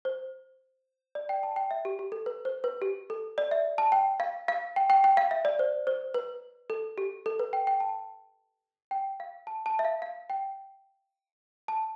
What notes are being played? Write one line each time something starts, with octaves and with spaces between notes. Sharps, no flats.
C5
D5
G5
A5
G5
E5
G4
G4
A4
B4
C5
B4
G4
A4
D5
E5
A5
G5
F5
F5
G5
G5
G5
F5
E5
D5
C5
C5
B4
A4
G4
A4
B4
G5
G5
A5
G5
F5
A5
A5
E5
F5
F5
G5
A5